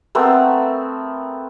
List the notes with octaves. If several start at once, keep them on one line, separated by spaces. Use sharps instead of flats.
A3 B3 C4 A#4